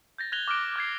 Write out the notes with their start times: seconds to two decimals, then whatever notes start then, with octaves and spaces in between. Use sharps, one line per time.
0.18 G6 A6 A#6
0.32 F#6 G#6 A#6 F7 G7
0.48 D6 F6 F#6 D7
0.76 D6 F6 G#6 C7